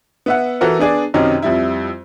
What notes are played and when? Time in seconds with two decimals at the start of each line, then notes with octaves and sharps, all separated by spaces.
0.26 B3 E5 F#5
0.61 E3 F#4 A4 A#4
0.79 B3 D4 G#4 D5
1.14 F#2 C3 D#3 C#4 D#4
1.42 F2 G3 E4